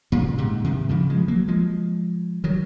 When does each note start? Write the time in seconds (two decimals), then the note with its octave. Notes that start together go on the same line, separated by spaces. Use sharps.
0.12 A#2 C#3
0.38 G#2 C3
0.64 C3 D#3
0.89 C#3 F3
1.09 F3 G#3
1.28 F#3 A#3
1.48 F3 G#3
2.44 D#3 F#3